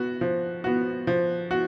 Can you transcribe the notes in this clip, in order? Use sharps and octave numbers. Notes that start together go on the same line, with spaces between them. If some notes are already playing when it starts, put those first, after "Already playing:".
Already playing: B3 F#4
F3
B3 F#4
F3
F#4